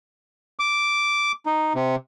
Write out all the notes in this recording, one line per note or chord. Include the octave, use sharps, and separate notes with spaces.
D6
D#4
C3